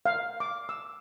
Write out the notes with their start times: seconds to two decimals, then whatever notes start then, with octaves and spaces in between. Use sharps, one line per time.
0.06 F5
0.40 D6
0.69 E6